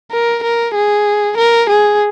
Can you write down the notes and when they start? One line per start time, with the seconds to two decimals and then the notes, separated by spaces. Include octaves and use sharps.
0.12 A#4
0.44 A#4
0.76 G#4
1.38 A#4
1.70 G#4